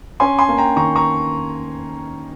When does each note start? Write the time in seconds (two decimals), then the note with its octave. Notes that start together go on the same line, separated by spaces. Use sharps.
0.20 C#4 G#5 C6
0.39 G#5 C6
0.49 A#3
0.57 G5 A#5
0.76 D#3 A#5 C#6
0.96 A#5 C#6